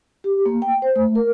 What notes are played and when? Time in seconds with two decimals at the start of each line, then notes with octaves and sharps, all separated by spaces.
0.24 G4
0.46 A#3
0.62 G5
0.82 C5
0.96 A3
1.15 A#4